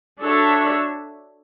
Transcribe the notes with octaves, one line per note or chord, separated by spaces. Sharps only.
D4 F#4 A4 C#5 E5